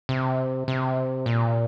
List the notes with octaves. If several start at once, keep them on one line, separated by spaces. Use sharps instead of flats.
C3
C3
A#2